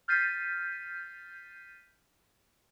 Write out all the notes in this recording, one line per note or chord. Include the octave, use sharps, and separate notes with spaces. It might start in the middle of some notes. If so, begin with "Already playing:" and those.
F6 G6 A6 B6 C7 D#7